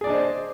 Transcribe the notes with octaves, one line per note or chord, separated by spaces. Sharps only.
D4 G#4 C5 D5 D#5